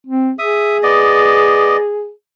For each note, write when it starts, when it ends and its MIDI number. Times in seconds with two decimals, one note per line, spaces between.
0.07 0.32 60
0.39 2.10 68
0.39 0.78 76
0.39 0.78 87
0.83 1.77 59
0.83 1.77 74
0.83 1.77 75